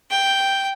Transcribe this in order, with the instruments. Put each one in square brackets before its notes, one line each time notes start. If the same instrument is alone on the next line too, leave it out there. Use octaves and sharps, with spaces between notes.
[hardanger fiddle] G5